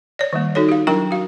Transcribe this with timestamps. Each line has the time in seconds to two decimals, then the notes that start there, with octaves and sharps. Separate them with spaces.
0.19 C#5 D5
0.33 D#3 G3 A#3
0.55 D#4 F#4 A4 C#5
0.69 G4 F5
0.87 F#3 D4 E4 A#4 G5 C#6
1.11 F#4 F5